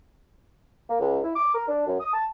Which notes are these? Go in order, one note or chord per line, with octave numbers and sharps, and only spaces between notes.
A#3
C#2
E4
D6
A#4
D4
F#2
D#6
A5